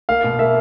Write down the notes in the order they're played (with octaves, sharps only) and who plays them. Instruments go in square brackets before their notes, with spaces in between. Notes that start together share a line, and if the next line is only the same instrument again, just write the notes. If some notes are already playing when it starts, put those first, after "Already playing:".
[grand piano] A#3 F5
B2
A#3 E5